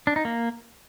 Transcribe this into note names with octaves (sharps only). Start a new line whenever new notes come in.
D4
D#4
A#3